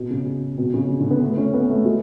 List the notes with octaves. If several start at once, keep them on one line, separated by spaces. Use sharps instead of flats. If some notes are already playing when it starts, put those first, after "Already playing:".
Already playing: B2
C#3
B2
C#3
D3
D3
B3
A3
C#4
B3
A3
G#3